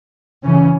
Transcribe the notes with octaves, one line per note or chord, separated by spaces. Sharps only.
C#3 E3 C#4